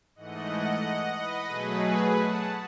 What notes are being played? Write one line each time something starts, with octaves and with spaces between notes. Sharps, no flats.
G#2 E3 A3 D#5 F#5
B4 D#5
B2 F#3 A3 G#4 B4
F#5 A5